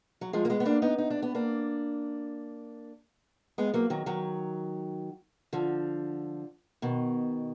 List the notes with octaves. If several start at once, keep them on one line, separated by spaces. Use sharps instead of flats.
F#3
F3 G#3
A#3
G#3 B3
B3
A#3 D4
B3 D#4
D#4
D4
B3
A#3 D4
G#3 B3
F#3 A#3
D#3 F#3
D#3 F#3
D3 F3
B2 D#3